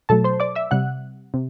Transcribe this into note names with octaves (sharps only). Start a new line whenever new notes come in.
B2 F#3 A3 A4 A5
C5 C6
D5 D6
E5 E6
C3 G3 F#5 F#6
C3